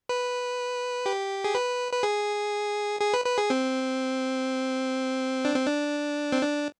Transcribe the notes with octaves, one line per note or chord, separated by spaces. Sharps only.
B4
G4
G#4
B4
B4
G#4
G#4
B4
B4
G#4
C4
D4
C4
D4
C4
D4